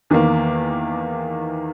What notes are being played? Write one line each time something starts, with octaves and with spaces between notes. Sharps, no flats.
E2 D#3 A#3